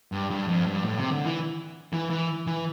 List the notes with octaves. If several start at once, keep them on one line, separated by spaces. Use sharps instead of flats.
G2
G2
F2
G2
A2
C3
D3
E3
E3
E3
E3